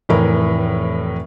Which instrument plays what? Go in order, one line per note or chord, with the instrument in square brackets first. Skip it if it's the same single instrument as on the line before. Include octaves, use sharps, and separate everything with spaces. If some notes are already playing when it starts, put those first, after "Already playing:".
[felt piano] F1 A2 E3 A#4